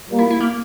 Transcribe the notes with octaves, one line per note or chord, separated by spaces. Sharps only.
A#2 G3 A#3
E4
E4
A#3